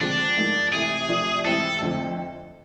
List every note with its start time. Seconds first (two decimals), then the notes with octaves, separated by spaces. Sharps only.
0.01 D3 F3 G#3 C4 D4
0.37 G#2 F3 A#3 D#4
0.73 C3 E3 A3 G#4
1.08 C3 F3 A3 D4
1.45 G#2 E3 G3 C4 E4 A4
1.81 F2 D3 F3 A3 C4